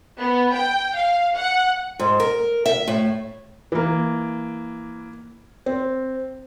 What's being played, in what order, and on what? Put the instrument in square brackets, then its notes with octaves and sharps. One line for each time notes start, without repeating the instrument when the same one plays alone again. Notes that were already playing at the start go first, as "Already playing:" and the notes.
[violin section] B3
G5
F5
F#5
[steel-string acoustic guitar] G#2
A#4
E5
A2
[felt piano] E3 A#3
C4